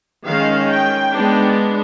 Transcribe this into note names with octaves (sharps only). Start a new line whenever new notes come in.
D#3 G#3 C#4 F5
G5
G#3 B3 D4